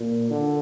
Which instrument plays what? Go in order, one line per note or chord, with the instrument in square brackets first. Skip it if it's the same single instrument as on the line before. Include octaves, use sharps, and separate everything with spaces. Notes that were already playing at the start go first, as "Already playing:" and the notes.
Already playing: [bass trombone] A#2
D3